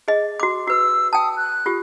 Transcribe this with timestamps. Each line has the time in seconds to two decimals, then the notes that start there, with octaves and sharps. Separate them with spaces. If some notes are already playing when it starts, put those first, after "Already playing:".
0.08 G#4 D#5
0.40 F#4 D6
0.68 F#4 B4 E6
1.13 G5 A5 D#6
1.37 F#6
1.66 F4 G4